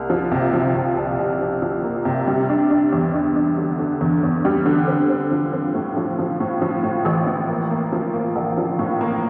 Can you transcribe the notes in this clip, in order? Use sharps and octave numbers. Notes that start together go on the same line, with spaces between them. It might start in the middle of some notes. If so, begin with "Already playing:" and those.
Already playing: C2 A#3
F3
C3
F3
C3
C2
C2
F3
F3
A#3
C3
G3
D4
D4
E2
D4
D4
D3
D3
E2
E2
G3
D3
C4
C4
F3
C4
A2
F3
F3
A2
F3
A2
A1
A2
A#3
A#3
F3
A#3
A#1
F3
A2
A#3